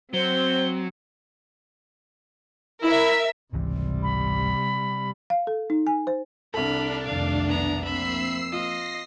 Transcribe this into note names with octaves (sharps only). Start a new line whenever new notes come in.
F#3 C4 C5 G7
E4 A#4 E5
G#1 C#2 C3 E3 G3
B5
F5
A4
D#4
G#5
C5
C2 D4 A4 B5 F6
F1 B1 D#3 F5
B3 A#5
F3 A#3 C4 E5 B5 E6 C7
F4 D#5 A#6 C7